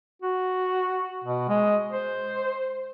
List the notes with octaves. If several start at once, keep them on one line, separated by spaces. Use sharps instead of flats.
F#4
B2
G#3
C5